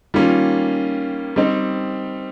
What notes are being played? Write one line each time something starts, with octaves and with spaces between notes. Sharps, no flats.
D#3 G3 A#3 C#4 F4
G3 C4 D#4